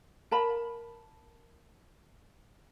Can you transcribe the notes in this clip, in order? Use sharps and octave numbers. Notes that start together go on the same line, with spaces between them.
A#4 A5 B5